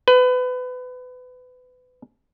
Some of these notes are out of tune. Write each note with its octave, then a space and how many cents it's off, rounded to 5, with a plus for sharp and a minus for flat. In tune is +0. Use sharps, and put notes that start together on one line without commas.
B4 +25